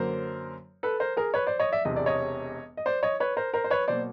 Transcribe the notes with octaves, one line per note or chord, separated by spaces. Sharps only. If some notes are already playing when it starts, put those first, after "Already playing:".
Already playing: F#2 D3 F#3 A#3 A#4 C5
A4 B4
A#4 C5
G#4 A#4
B4 C#5
C5 D5
C#5 D#5
D5 E5
E1 E2 C3 D#5
D5
C#5 D#5
D#5
C5 D5
C#5 D#5
B4 C#5
A#4 C5
A#4 C5
C5
B4 C#5
B2 F#3 A#3 C5 D5